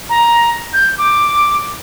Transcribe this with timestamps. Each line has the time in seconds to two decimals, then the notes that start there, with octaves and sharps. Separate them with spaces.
0.09 A#5
0.73 G6
0.98 D6